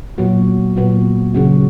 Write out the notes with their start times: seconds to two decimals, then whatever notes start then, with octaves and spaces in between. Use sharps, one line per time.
0.18 A#2 F#3 B3 F#4
0.76 A#2 F#3 B3 F#4
1.34 C#3 F#3 C#4 F#4